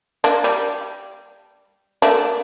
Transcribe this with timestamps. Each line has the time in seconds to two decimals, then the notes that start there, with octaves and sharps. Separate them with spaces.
0.24 A#3 D4
0.44 G3
2.02 A3 A#3 D4